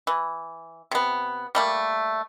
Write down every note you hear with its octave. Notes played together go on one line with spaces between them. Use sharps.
E3
C3 B3
G3 A3 A#3